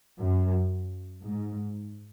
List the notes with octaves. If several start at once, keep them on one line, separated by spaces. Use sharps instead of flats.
F#2
G#2